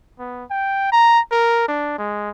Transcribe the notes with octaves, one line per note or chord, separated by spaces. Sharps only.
B3
G5
A#5
A#4
D4
G#3